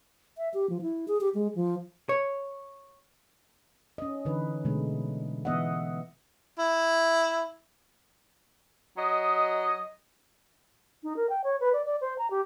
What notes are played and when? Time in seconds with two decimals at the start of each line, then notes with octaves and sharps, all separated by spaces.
0.38 E5
0.54 G4
0.70 F3
0.82 E4
1.08 G#4
1.21 G4
1.34 G#3
1.56 F3
2.09 C#5
3.98 C#4 D#5
4.25 D3 E3 D#4 B4
4.64 B2 D3 G#3 A3
5.45 E3 B3 D#5 E5 F#5
6.59 E4
8.98 F#3 D#5
11.03 D#4
11.16 A#4
11.29 G5
11.44 C#5
11.60 B4
11.73 D5
11.85 D5
12.01 C5
12.18 A#5
12.30 G4